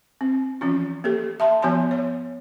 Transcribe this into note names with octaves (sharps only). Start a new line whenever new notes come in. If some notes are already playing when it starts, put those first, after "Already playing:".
C4
E3 F3 C#4 F4
A#3 G4 A4
E5 A5 C6
F3 B3 F#4 C#5 G#5 C6
C#5